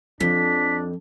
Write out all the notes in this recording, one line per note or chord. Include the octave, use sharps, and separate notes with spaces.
F2 F3 D4 B6